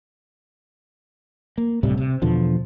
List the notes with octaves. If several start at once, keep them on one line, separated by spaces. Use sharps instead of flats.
A#3
D1 A2 C3 G3
C3
E2 B2 D3 F3